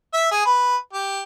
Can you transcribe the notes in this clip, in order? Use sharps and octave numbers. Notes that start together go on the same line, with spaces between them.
E5
G#4
B4
G4